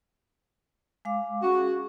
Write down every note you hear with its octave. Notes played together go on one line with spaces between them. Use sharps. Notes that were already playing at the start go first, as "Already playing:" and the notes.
G#3 F5 D6
C#4 F#4 G#4